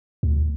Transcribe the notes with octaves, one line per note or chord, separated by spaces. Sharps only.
D2